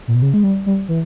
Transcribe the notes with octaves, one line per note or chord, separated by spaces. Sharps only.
A#2
B2
C#3
G#3
G3
G3
E3